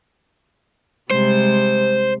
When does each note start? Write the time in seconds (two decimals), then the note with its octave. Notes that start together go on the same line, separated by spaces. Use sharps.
1.11 C3 G3 G#3 C5